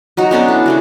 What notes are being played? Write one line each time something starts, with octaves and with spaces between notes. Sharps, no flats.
F#3 D#4 F#4
B3 C#4 D4 A4
E4
C#3 A3 F#4